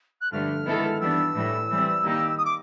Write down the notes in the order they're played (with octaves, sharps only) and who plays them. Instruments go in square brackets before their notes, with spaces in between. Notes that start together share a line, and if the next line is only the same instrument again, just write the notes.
[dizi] F#6
[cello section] G2 D3 F3 A3 [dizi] F6
[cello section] D#3 G#3 B3 E4 A4
[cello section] E3 G3 B3 D4 [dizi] E6
[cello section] A2 E3 G3
E3 G3 C4
D#3 G3 A#3 D#4 G4
[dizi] D#6
D6